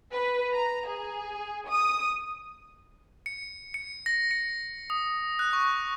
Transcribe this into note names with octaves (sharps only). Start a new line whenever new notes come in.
B4
A#5
G#4
D#6
C#7
C#7
A#6
C#7
D#6
F#6
C#6